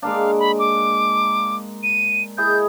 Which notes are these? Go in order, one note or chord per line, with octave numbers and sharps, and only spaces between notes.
G#3 A#3 D4 F5
B5
D6
D#7
E4 G#4 D#5 G6